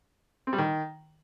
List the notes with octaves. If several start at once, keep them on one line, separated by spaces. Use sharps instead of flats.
C4
G3
D#3